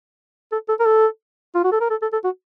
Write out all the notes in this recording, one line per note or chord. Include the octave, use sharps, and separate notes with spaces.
A4
A4
A#4
A4
F4
F#4
A4
A#4
A4
A4
A4
F#4